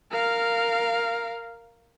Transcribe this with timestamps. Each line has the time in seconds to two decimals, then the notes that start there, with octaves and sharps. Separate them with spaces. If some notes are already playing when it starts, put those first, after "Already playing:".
0.11 A#4 F5